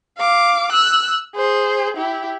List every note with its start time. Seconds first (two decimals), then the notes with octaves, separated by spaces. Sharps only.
0.18 F5 D6
0.72 E6 F#6
1.35 G#4 C5
1.97 E4 G4